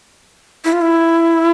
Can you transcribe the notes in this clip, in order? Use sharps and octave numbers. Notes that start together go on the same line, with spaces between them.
E4
F4
E4